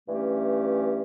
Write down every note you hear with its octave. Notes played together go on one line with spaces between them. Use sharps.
G2 E3 A3 C#4 G4